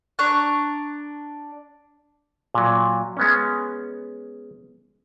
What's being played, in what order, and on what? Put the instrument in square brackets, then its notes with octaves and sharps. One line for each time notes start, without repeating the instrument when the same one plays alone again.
[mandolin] D4 A#5 C#6 F#6
[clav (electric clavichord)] A#2 F#3
G#3 B3 C#4